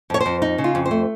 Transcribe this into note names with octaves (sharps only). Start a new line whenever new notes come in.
F2 C#5
C5
F2
D#4
C#3
F4
F2
C5
A3